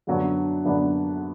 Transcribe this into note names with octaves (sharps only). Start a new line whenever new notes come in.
F#2 D3 F#3 B3 D4
F#2 D3 F#3 B3 D4